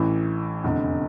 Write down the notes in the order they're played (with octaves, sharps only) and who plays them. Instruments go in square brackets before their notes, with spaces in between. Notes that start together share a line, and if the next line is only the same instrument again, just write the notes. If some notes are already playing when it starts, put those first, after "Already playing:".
Already playing: [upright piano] A1 A2 E3
F1 E2 D3